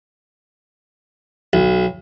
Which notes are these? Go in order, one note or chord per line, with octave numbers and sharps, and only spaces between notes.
B1